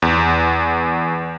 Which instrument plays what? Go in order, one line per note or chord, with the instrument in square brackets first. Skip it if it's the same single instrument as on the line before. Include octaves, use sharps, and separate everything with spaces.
[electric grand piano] E2